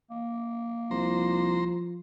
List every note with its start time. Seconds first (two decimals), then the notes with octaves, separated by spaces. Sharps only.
0.11 A#3
0.91 C2 F3 C5 A#5